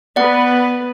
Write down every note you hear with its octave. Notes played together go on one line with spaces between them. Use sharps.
B3 B4 D5 F#5